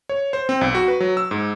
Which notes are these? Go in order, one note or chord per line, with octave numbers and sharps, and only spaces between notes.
C#5
C5
C4
B1
F#4
B4
F#3
E6
G#2